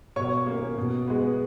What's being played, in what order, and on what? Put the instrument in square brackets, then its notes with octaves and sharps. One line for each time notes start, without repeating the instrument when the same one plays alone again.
[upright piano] B2 C#5 C#6
A#3 C#4
B2
G#3 B3